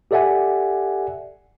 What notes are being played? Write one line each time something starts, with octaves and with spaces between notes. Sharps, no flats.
G4 A4 D5 E5 F#5 G#5